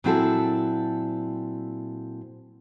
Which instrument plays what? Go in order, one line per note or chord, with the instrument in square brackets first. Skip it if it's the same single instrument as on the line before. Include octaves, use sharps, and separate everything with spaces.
[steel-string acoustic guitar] A#2 F#3 C4 E4 G#4 A4